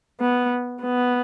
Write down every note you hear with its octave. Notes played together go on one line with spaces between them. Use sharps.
B3
B3